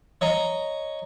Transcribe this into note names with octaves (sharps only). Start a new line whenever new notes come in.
C#5 D#5 A#5